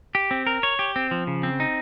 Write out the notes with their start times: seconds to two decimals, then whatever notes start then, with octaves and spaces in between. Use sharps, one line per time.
0.15 G4
0.31 C4
0.47 A#4
0.63 C#5
0.79 G4
0.96 C4
1.11 F3
1.27 C#3
1.43 C4
1.60 D#4